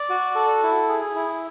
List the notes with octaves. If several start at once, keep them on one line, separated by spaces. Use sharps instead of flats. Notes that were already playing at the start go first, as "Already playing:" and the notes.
Already playing: D5
F#4
A4
E4
G#4
E4